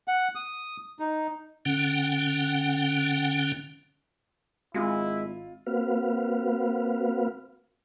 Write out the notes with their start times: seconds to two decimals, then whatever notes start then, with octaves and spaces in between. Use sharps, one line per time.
0.08 F#5
0.35 D#6
0.99 D#4
1.65 D3 C#4 F#5 G5
4.74 G#1 G#3 E4 F4
5.66 A#3 C4 F#4 B4 F5